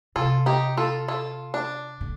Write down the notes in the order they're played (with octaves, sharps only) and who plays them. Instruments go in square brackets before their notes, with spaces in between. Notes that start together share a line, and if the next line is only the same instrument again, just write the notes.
[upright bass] C3 [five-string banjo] F4 A4
[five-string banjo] D#4 G4
F4 A4
F4 A4
D4
[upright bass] D3